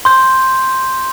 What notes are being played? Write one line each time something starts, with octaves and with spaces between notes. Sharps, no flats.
C6 G6